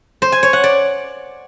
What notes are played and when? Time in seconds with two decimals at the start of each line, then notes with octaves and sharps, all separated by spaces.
0.22 C5
0.32 G#5
0.43 C#5
0.53 F#5
0.64 D5